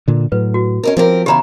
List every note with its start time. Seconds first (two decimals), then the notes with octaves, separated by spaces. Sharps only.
0.08 A#2 D3
0.32 A2 F#3 B4
0.54 F#4
0.83 C#4 D#4 A#4
0.97 F3 C4 G4 A#4
1.26 C#3 E3 B3 G4 A#5